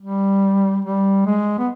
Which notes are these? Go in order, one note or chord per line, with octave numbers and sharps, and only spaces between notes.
G3
G3
G#3
B3